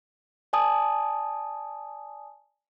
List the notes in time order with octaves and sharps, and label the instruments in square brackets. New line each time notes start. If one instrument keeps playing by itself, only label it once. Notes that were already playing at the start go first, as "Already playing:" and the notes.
[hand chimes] D5 G#5 A5 D#6